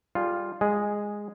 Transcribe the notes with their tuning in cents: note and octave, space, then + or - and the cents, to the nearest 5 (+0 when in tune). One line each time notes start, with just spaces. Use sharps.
G3 +5 F4 +0 G#4 +40
G#3 -10 G#4 +0